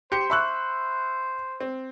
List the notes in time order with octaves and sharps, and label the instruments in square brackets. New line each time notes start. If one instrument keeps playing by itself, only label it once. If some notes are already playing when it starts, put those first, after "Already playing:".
[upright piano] G4 [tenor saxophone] C5 [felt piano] C#7
[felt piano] E5 C#6 F#6 [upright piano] B5 E6
[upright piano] C4